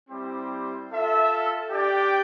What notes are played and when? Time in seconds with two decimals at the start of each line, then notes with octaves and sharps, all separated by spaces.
0.09 G3 C4 E4 G4 C5
0.90 F4 A4 E5
1.70 D4 G4 D5 G5